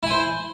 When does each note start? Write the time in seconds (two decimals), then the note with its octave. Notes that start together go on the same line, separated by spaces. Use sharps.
0.03 E4
0.07 G#5
0.10 C5